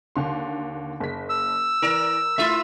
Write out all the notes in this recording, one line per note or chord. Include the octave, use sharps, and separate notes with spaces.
D#2 D3 C6
F#1 B6
E6
E3 A#4 D5 E7
A3 E4 F4 E5